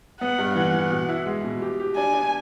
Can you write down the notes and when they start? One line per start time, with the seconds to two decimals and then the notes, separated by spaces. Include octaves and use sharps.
0.20 B3 F#5
0.38 G2
0.56 E3 F#5
0.73 E3
0.91 B2
1.08 E4
1.26 G#3
1.44 B2
1.62 G4
1.80 G4
1.96 D4 G#5
2.13 D4